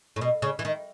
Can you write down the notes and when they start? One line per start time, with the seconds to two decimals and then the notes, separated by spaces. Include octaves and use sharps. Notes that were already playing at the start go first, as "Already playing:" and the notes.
0.16 A2
0.21 B2
0.42 C#3
0.59 E3
0.65 D#3